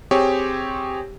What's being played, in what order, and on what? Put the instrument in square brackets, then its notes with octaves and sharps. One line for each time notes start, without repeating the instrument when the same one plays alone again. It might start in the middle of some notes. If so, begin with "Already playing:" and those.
[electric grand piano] C4 G4 G#4 C#5